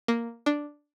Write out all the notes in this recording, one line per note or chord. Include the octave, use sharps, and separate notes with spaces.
A#3
D4